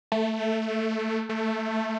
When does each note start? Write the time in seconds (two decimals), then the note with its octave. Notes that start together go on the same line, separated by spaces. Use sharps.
0.12 A3
1.29 A3